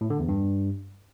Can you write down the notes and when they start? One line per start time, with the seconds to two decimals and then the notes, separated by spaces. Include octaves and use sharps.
0.01 A2
0.10 D3
0.19 E2
0.29 G2